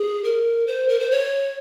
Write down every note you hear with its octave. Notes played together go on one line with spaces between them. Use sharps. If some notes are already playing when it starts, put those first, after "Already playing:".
Already playing: G#4
A#4
C5
A#4
C5
C#5